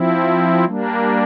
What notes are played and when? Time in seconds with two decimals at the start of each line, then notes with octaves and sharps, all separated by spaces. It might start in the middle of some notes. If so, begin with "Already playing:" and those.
Already playing: F3 C4 E4
0.65 G3 A#3 D4